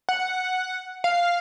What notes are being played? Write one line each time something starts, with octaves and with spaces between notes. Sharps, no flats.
F#5
F5